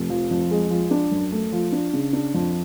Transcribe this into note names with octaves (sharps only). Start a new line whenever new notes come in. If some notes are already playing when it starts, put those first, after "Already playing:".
Already playing: F1
F3
F2
G#3
F3
D4
F#2
A3
F3
D4
C#3
D4
F2